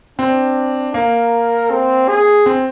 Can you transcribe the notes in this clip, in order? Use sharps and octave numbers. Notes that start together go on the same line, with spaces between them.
C4 D4
A#3 A#4
C4
G#4
C4